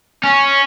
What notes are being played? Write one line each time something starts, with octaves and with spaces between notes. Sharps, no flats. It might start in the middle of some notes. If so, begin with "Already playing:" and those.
C#4